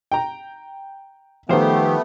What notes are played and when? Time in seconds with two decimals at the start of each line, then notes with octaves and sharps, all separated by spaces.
0.12 G5 A#5
1.49 D#3 F3 A3 B3 G4 G#4 C5